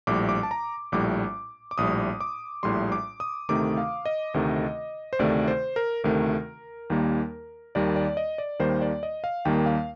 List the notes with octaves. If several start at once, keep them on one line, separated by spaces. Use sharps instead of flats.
A#1 A2 G3 D6
D6
A5
A#5
A#1 A2 G3 D6
D6
A#1 A2 G3 D#6
D6
A#1 A2 G3 C6
D6
D#6
D2 C3 D#3 A3 D6
F5
D#5
D2 C3 D#3 A3
C5
D2 C3 D#3 A3 D5
C5
A#4
D2 C3 D#3 A3 A#4
D#2 D#3 G3 A#3
D#2 D#3 G3 A#3 D5
D5
D#5
D5
D#2 D#3 G3 A#3 C5
D5
D#5
F5
D#2 D#3 G3 A#3 G5
F5